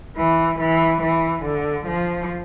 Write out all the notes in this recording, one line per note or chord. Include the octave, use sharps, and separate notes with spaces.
E3
E3
E3
D3
F3